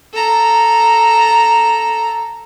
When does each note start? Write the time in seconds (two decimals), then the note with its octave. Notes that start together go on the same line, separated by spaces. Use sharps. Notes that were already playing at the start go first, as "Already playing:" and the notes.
0.14 A4 A#5